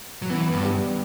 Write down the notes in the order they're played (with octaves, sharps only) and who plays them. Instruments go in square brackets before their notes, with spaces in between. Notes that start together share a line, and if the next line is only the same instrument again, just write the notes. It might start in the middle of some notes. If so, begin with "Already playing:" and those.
[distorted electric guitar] F#3
[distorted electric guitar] E3 [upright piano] B3
[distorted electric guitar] G2
[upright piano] G3